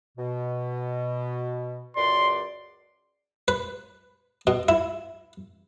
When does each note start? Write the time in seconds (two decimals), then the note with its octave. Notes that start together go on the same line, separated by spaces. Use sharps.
0.18 B2
1.96 C#2 F#2 D5 C6
3.48 B4
4.47 B2
4.69 E4